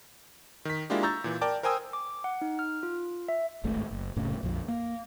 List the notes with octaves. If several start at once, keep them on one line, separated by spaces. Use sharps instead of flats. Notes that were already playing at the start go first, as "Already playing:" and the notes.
D#3 B6
G#3 A#3 D4 E4 F4 G4
A#5 C#6 E6 G6 A6
A#2 E3
A#4 D5 G5 A5 D6
A#4 C5 G5 G#5 D#6 E6
D6
F#5
D#4
F6
F4
E5
D1 G#1 G#2 A3
F#1
F1 A2 C#3
A#1 F2
A#3